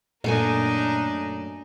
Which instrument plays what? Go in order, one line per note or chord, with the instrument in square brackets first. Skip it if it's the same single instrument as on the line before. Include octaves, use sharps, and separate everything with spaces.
[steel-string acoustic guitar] F#2 A3 G#5 [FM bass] A#2 [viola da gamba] A#3 D4 D#4